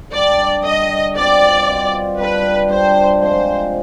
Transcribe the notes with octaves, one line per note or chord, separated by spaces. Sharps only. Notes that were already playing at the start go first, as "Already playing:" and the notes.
D3 G3 D4 D5
D3 G3 D4 D#5
B2 G3 C4 F4 D5
B2 G3 C4 F4
G3 D4 G4 B4
G3 D4 G4 C5
C3 F3 G#3 C5